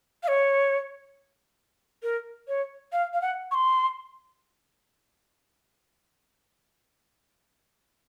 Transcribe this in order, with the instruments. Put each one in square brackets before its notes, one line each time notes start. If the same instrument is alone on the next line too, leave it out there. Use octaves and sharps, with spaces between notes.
[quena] F5
C#5
A#4
C#5
F5
F5
F#5
C#6
C6